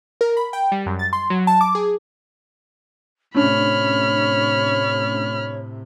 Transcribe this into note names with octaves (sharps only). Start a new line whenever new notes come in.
A#4
B5
G5
G3
F#2
A6
C6
F#3
A5
D6
G#4
A2 C3 A3 C#4 D4 C#5 B5 F6